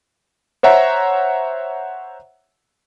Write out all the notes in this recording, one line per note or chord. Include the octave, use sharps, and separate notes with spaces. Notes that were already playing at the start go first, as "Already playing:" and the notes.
C5 C#5 E5 F#5 A#5